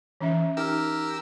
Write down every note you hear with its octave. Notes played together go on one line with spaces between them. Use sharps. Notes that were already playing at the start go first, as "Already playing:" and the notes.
E3 C#4 E5
D#4 G4 A#4 E6 F6